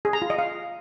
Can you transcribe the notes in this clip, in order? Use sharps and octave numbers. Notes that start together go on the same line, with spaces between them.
G#4
A#5
F4
D#5
F5